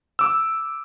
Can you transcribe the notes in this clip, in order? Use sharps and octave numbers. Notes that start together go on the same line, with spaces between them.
D6 E6